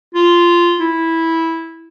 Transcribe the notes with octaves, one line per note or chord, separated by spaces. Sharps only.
F4
E4